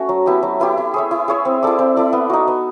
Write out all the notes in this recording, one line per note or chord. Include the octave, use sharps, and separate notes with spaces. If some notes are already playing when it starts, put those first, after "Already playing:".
Already playing: A3 C#4 F#4
F#3
B3 E4 G4
F#3
B3 E4 G4
E4
G#4 C#5 E5
E4
G#4 C#5 E5
C4
E4 A4 D5
C4
E4 A4 D5
B3
D#4 F#4
B3